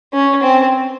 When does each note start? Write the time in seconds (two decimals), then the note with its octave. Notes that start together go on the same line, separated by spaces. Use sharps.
0.14 C#4
0.43 C4